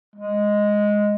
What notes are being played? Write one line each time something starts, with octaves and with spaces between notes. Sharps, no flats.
G#3